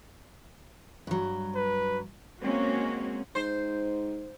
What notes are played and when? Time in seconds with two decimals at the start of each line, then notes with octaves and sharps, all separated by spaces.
1.07 G2 F#3
1.55 B4
2.40 G#3 A#3 C4 C#4 F#4
3.35 G#2 C5